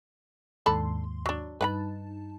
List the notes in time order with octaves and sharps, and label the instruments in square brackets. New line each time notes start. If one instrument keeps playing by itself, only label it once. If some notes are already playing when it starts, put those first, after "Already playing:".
[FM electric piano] D#2 G#2 C6 [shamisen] D3 A4 B5
[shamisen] F#3 D4
[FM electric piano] G2 D#4 A5 [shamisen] B4 F#5 B5